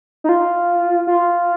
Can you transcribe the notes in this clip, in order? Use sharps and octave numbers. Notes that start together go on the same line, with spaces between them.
D#4
F4
F4